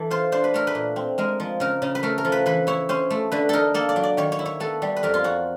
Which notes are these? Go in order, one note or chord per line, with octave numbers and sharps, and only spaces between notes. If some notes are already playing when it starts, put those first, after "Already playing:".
Already playing: E3 A4
F4 C5
D4 C5
B4
A3 A#4
B4
A#2
C4
G#3 A#4
F3
C#3 A#4
C#3
B4
A3 A#4
A#4
F3
B4
E3 B4
E4 C#5
C#4 C5
A3
D3 B4
D#4 A4 A#4
A#3 A4
D5
F#3
D5
D#3 C#5
C#5
E4
C#5
B3 A4
G3
B4
F2 A#4
F4
F2 F#4